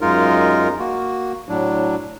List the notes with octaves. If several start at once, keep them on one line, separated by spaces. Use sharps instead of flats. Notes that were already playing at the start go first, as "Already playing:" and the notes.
F#2 G#3 D#4 F4 A#4
A#3 F#4
A2 F#3 D4